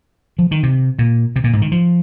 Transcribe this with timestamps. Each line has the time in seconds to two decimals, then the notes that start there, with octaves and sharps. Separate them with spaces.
0.39 F3
0.51 D#3
0.63 C3
0.99 A#2
1.36 C3
1.44 A#2
1.53 G#2
1.62 D#3
1.72 F3